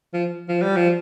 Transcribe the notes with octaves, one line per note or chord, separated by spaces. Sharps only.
F3
F3
G3
F3